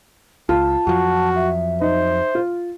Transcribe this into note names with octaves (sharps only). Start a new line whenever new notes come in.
C#2 F4 A5
F2 F3 F#3 F#4
E5
D#4 C5
F4